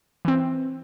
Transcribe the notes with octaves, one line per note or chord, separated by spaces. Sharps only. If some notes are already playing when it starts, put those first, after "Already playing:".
E3 C4